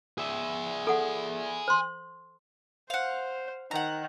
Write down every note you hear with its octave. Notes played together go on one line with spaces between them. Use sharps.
G#4 E5
A4 F#5
C5 C6
C5 F5 F#5
D#3 F#5 A#5